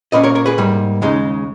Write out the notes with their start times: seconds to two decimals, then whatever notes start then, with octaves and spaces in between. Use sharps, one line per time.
0.12 A#2 A#3 C#4 B4 D#5
0.23 A#4 C#5
0.35 A#4 C#5
0.46 G#4 B4
0.58 G#2 G3 A#3
1.02 D#2 C#3 G#3 D#4